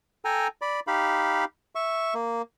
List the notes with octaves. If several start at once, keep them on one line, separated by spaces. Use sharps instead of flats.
A4 G5 G#5 A#5
D5 B5
D#4 G4 F5 B5
E5 C#6
A#3